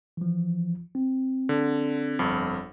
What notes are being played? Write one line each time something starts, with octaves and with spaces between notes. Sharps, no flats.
E3 F3
C4
D3
G1 F2